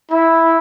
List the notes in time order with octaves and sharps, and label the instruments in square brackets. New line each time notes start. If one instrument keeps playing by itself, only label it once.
[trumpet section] E4